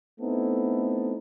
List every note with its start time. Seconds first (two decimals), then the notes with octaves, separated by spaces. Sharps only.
0.20 A3 B3 C4 D#4 E4 A4